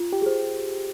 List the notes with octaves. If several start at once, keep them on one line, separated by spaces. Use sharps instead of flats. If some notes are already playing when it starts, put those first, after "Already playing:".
Already playing: F4
G4
G#4 C5